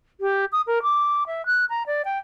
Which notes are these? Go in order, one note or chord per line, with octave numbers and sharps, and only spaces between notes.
G4
D#6
A#4
D6
E5
F#6
A#5
D5
G5